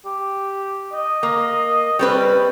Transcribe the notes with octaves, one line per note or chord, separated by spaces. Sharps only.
G4
D#5
A#3
G3 C4 C#4 B4